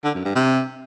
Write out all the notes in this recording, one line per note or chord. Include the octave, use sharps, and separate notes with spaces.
D3
F#2
G2
C3